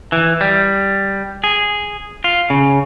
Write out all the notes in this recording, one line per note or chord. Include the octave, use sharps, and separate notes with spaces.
E3
G3
G#4
F4
C#3